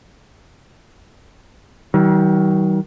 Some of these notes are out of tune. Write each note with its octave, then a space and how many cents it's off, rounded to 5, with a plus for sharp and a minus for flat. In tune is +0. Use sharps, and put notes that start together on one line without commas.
D#3 +30 G3 -45